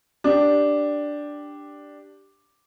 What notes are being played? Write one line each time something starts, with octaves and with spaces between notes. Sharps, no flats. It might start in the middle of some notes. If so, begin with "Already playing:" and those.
D4 G4